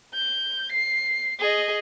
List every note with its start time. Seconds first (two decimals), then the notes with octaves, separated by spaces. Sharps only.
0.14 G6
0.72 C7
1.40 G#4 D#5